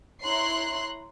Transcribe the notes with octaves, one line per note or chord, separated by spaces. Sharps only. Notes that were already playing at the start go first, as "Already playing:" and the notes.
E4 C#5 A#5 C6 F#6 C7